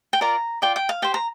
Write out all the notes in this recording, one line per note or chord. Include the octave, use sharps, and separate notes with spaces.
G5
F4 A#4 D5 A#5
F4 D5 G5
G5
F5
G4 C5 G5
A#5